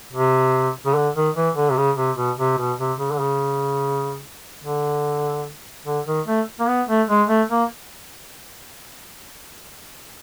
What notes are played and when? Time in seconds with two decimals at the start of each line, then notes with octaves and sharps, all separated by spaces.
0.12 C3
0.86 C#3
0.95 D3
1.15 D#3
1.35 E3
1.56 D3
1.70 C3
1.77 C#3
1.97 C3
2.17 B2
2.38 C3
2.58 B2
2.79 C3
2.99 C#3
3.12 D3
3.20 C#3
4.63 D3
5.85 D3
6.06 D#3
6.27 A3
6.59 A#3
6.68 B3
6.88 A3
7.09 G#3
7.28 A3
7.50 A#3